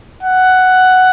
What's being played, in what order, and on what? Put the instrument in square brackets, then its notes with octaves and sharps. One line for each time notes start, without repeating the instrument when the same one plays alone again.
[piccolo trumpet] F#5